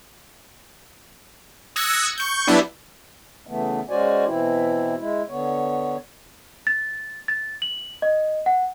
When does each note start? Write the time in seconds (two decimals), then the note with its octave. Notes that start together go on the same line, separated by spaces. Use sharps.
1.76 D#6 E6 F#6 G#6 A#6 C#7
2.18 C#6 G6
2.47 F#3 G3 B3 D4 E4
3.47 C#3 E3 A3 B3
3.89 G#3 C#4 F#4 C5 D5 G#5
4.25 B2 E3 C4 E4
4.98 G#3 E4
5.28 D3 B3 C#5
6.67 A6
7.28 A6
7.62 F#7
8.02 D#5
8.46 F#5